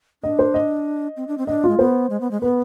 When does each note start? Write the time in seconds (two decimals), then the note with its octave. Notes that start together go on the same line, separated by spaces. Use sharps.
0.23 D4 D#5
0.39 C5
0.54 D#5
1.17 C4
1.28 D4
1.38 C4
1.47 D4 D#5
1.64 F4
1.69 G#3
1.79 B3 C5
2.10 G#3
2.21 B3
2.31 G#3
2.41 B3 B4